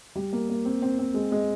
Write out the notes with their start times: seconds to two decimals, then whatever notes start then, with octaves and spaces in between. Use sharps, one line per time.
0.15 G3
0.33 A#3
0.49 A#3
0.65 C4
0.82 C4
0.99 C4
1.14 G#3
1.32 G#3